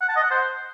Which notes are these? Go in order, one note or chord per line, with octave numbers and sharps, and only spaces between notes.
F#5
A5
D#5
F#5
C5